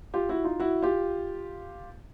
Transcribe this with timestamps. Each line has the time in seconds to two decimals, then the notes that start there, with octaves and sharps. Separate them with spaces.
0.14 F4 G4
0.29 E4 F#4
0.44 D#4 F4
0.60 E4 F#4
0.83 F4 G4